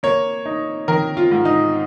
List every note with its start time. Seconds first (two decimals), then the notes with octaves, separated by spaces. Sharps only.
0.03 A#3 C#5
0.45 D#4
0.88 D#3 A#4
1.17 F4
1.31 G#2
1.45 D#4